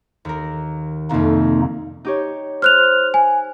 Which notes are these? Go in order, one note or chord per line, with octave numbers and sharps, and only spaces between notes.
D#2 A#4
C2 F2 A#3 D#4
D#4 G4 C#5
C5 F6 F#6 F7
G#5